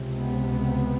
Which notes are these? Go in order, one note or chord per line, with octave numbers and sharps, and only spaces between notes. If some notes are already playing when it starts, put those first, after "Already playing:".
Already playing: C#2 C3
B3